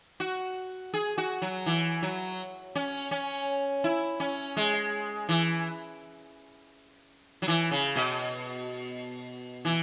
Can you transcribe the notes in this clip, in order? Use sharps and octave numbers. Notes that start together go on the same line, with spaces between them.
F#4
G#4
F#4
F#3
E3
F#3
C#4
C#4
E4
C#4
G#3
E3
F#3
E3
C#3
B2
E3